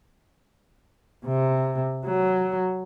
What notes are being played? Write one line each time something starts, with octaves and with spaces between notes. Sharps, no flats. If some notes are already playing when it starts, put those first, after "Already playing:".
C3
F#3